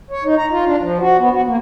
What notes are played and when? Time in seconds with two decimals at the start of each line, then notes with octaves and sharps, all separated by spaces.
0.11 C#5
0.24 D#4
0.38 A#5
0.51 F4
0.66 D4
0.80 F3
0.99 F#4
1.19 B3
1.33 F#4
1.46 A#3